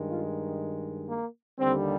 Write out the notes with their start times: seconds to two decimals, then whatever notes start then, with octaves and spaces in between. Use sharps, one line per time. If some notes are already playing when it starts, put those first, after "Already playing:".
Already playing: G2 D#3 G#3
0.10 F4
1.09 A#3
1.59 D#2 D3 G3 C4